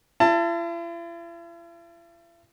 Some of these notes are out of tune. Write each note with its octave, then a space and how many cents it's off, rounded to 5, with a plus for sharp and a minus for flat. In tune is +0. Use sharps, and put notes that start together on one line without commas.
E4 +45 A5 +20